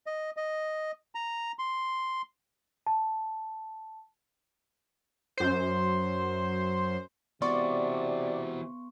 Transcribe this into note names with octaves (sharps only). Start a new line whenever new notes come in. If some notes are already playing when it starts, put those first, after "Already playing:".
D#5
D#5
A#5
C6
A5
F#2 C5
C3 E3 B3 F#4 D5 C6 C#6